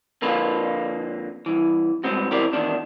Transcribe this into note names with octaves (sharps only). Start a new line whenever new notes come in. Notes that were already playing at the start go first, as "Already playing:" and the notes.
F2 D3 A#3 F4 B4
C2 E3
G2 G#3 B3 C4 F#4
E3 C4 G4 A#4 D5
E2 A#2 D#3 D4